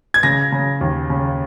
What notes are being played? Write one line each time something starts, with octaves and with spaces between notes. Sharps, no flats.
G#6
C#3 A#6
C#3
D#2
C#3